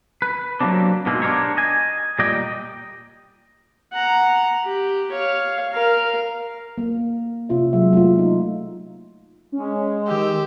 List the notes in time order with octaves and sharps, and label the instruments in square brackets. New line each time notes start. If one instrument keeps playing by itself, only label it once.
[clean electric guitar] B4
F#3 G3 A3 A#3 C4 D4
G#2 B2 G#3 A#3 C4
D4 G4 A#4 C5 C#5
D#5 G#5
A#2 G3 A#4 D5 D#5 G5
[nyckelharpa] F#5 A#5
G4
C#5 F5
A#4 F5
[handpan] A#3
C3 C#4 F4 E5
F#3 G#3 E5 F#5
A3 A#3 F4
D#4
[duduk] G#3 [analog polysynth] C#4
[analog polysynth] D#3 E6 [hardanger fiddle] G4